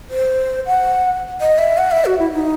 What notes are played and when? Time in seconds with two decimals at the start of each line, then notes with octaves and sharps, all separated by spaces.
0.10 C5
0.66 F#5
1.41 D#5
1.58 E5
1.78 F#5
1.91 E5
2.05 F#4
2.19 E4
2.33 D#4